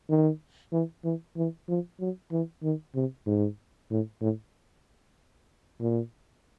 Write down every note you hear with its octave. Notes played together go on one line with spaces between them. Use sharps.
D#3
E3
E3
E3
F3
F#3
E3
D#3
C3
G#2
A2
A2
A#2